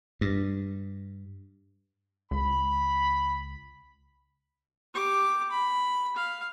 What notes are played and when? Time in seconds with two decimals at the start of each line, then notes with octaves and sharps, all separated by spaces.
0.21 G2
2.31 C#2 B5
4.94 G4 D6
5.51 B5
6.16 F5